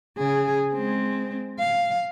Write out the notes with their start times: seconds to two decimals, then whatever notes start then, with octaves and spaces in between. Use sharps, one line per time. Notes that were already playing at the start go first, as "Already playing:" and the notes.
0.17 C#3 G#4
0.74 G#3 C4
1.59 F5